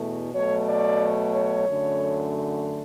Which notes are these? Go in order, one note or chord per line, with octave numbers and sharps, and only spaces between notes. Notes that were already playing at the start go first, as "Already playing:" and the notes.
Already playing: E2 B2 A3
B2 F#3 A3 C#5
D5
C#5
F#2 D3 A3